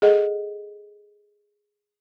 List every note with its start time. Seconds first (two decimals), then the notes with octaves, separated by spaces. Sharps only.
0.02 G#4 A4 D#5 F#5